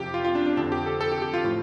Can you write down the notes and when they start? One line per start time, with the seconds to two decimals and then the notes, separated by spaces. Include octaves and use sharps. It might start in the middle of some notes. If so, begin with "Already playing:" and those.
Already playing: F2 C3 F3 G4
0.14 F4
0.25 F4
0.35 D4
0.46 D4
0.57 F2 D3 F3 D4
0.72 G4
0.86 A4
1.01 A4
1.12 G4
1.22 G4
1.34 F4
1.44 A2 F3